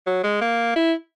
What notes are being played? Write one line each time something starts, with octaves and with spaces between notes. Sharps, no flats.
F#3
G#3
A#3
E4